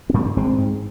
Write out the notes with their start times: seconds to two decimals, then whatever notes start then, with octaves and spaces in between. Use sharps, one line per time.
0.10 C4
0.14 G#2 G3 A#3
0.36 G#1 G#3 C4
0.58 G#2